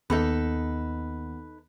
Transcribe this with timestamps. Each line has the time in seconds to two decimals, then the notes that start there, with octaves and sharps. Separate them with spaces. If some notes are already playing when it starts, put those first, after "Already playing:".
0.10 D#2 B3 D#4 A4 B4